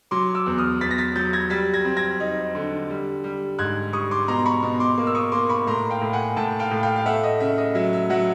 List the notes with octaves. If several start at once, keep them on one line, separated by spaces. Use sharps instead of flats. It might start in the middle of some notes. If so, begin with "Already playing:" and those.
F#3 C6 D6
D6 E6
E2
D#6 F6
E2 A6 B6
A#6
A6 B6
F#3 G6 A6
G#6 A#6
G3 A6 B6
G#6 A#6
C4
G#6 A#6
D#4
D3
G3
G3
G#2 F#6 G#6
G3 C#6 D#6
C6 D6
B2 A#5 C6
B5 C#6
B2
C6 D6
A#3
E6
C#6 D#6
A#3 C6 D6
B5 C#6
A2 A#5 C6
F5 G5
A2
F#5 G#5
A2 G5 A5
F5 G5
A2
F5 G5
F5
A3 E5 F#5
D#5
C#3 E5
D#5
F#3 E5
E5
F#3 E5 F#5